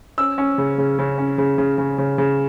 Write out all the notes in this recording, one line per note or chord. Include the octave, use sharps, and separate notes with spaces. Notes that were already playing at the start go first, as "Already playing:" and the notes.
C#4 E6
C#4
C#3
C#3
C#3
C#4
C#3
C#3
C#3
C#3
C#3